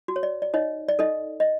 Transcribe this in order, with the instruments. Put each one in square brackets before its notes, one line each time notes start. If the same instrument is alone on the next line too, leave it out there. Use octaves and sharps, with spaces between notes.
[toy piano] F#4
C#5
D5
D5
D#4 C#5 D#5
D5
D#4 A4 D#5
D#5